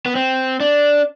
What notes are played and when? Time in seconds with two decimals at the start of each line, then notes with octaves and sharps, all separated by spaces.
0.06 B3
0.15 C4
0.60 D4